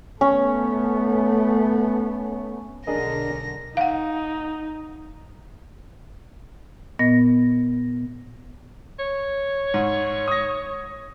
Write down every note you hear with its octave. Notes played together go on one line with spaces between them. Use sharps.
A3 B3 C#4
B1 D3 D4 G#4 A#4 D#5 A#6
D#4 F5 F#5
A#2 B3 D#5 A#6
C#5
G#2
D#6 A#6